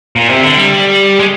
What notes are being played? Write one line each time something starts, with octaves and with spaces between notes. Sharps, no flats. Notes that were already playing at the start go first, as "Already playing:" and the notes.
A#2
C3
D3
G3
G#3